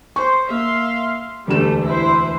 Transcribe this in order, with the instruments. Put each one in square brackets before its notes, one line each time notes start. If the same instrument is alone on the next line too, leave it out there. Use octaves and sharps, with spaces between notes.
[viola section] C5 [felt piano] C#6
[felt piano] A#3 [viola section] E5 F5 C6
[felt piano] E1 D2 E7 [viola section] G3 A3
[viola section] E4 B4 C5